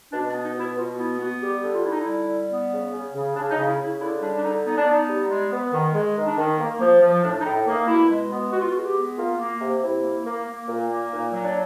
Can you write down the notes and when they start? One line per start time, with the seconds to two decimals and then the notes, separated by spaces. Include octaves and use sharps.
0.13 B2 D4
0.29 D4
0.34 B3
0.45 D#4
0.55 B2
0.60 E4
0.76 B2 F4
0.98 B3 E4
1.19 B3 F#4
1.41 G3 G4
1.63 D3
1.73 F4
1.83 D3 E4
1.91 D#4
2.00 E4
2.06 G3
2.27 G3
2.50 B3
2.71 C#3
2.92 C#3
3.14 C#3
3.35 C#3 D4
3.51 D#4
3.57 C#3
3.68 E4
3.79 C#3
3.84 E4
4.00 D3 E4
4.21 G3 D4
4.37 D4
4.43 D3 D#4
4.64 B3 D#4
4.77 D4
4.86 B3 D#4
5.08 G3
5.29 G#3
5.51 B3
5.73 D#3
5.94 G#3
6.16 D#3
6.26 D4
6.37 D#3
6.58 A#3
6.80 F3
7.01 F3
7.23 A2 D4
7.40 D#4
7.44 A2
7.55 E4
7.66 A#3
7.71 D#4
7.88 B2 E4
8.10 G#3
8.31 B3
8.52 B3 F#4
8.61 F4
8.71 F#4
8.74 G#3
8.84 G4
8.96 B3
9.16 A#3 F4
9.39 A#3
9.60 C3
9.81 C3 E4
10.03 A#3
10.25 A#3
10.46 A#3
10.67 A#2
10.90 A#3
11.11 A#2 D#4
11.33 F#3
11.43 D4